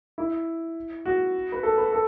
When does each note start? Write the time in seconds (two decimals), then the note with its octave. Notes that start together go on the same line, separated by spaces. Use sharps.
0.18 E4
1.05 F#4
1.52 B4
1.63 A4
1.78 B4
1.93 A4